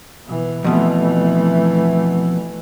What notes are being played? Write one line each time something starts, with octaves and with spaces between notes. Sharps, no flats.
B2 E3
F2 B2 E3 A3